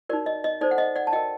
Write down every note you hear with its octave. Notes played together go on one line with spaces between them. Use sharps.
D#4 F#4 A#4 D5
D#5
D#5
D#4 A4 C5 D5
F#5
D#5
D5 F#5
A5
F#4 A#4 D#5 G5